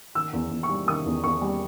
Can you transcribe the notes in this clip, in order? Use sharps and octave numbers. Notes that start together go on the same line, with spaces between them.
D#3 E6
E2
E2
C#6
G3
D#3 D#6
E2
E2 C#6
G3